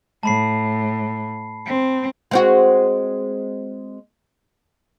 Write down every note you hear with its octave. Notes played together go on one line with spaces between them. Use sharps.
A2 A5 B5 C7
C4
G#3 C4 F#4